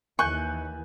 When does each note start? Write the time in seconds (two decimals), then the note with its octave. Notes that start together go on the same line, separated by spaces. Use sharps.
0.19 D#2 E3 G#5 C#6 F#6 G6